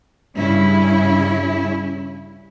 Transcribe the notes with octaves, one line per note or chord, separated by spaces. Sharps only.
G2 C#3 C#4 E4